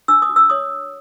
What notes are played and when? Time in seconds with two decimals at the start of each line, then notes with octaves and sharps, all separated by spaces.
0.08 D4 E6
0.22 D#6
0.29 F#4
0.36 E6
0.50 C#5 D#6